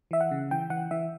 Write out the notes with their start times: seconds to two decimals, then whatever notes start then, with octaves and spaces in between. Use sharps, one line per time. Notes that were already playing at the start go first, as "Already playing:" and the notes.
0.11 E3 E5
0.21 F#5
0.31 C#3
0.51 E3 G5
0.70 E3 F#5
0.91 E3 E5